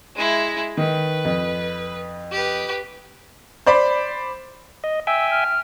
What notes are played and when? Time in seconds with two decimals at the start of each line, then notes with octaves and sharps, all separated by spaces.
0.16 G#3 E4
0.77 D#3 B4
1.25 F2
2.32 G4 B4
3.66 C5 D5 B5
4.84 D#5
5.07 E5 G5 G#5 E6
5.31 F6